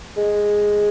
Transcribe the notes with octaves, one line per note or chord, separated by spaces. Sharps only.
G#3